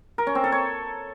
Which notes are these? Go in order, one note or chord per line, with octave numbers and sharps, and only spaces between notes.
A#4
C#4
C4
A4
C#5